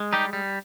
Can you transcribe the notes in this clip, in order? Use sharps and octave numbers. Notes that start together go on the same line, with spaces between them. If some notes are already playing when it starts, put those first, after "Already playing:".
Already playing: G#3
G3 D#4 G4
G3